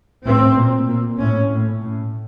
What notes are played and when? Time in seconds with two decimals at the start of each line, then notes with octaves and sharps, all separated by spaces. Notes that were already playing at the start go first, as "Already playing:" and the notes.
0.24 A2 C4
0.55 A#2
0.87 A#2
1.19 A2 C#4
1.51 A2
1.83 A2